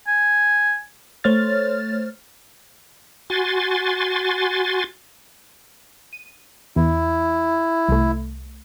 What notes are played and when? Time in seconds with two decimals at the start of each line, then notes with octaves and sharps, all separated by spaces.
0.07 G#5
1.24 A3 C5 C#5 F6 A6
3.30 F#4 G#5 C6 A6
6.13 D#7
6.76 E2 E4
7.88 C2 A3